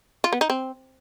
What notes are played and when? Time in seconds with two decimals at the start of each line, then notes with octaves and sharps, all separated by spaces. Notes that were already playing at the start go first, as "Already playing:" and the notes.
0.24 F4
0.33 B3
0.41 D#4
0.50 C4